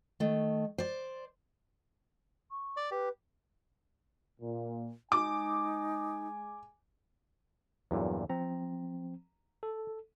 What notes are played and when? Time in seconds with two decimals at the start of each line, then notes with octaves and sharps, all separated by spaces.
0.20 D#3 A3
0.78 C5 D5
2.51 C#6
2.77 D5
2.91 G4 B4
4.40 A#2
5.12 G#3 D#4 G#5 D6
7.91 E2 G2 A#2 F#3
8.30 F3 C4 A#5
9.63 A4